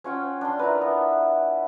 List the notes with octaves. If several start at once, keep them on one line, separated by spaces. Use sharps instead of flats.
C#4 F4 F#5 G5
D4 C6
E4 F4 A#4 B4
B3